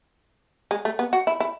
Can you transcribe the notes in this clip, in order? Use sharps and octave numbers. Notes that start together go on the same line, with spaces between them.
G#3
A3
B3
F#4
E4
E4